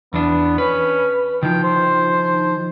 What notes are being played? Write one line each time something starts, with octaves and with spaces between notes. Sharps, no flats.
E2 B3 D4
C#4 B4
D#3 F3 G5
C5